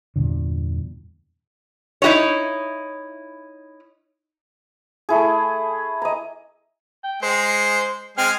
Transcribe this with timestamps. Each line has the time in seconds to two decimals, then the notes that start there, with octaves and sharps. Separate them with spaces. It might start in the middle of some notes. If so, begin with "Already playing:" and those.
0.16 E2 G2 A#2 D3
2.02 D#4 E4 F#4 A4 C#5
5.09 A3 E4 G#4
6.02 D#5 A#5
7.04 G5
7.22 G#3 C5
8.18 G#3 C4 G#5 F6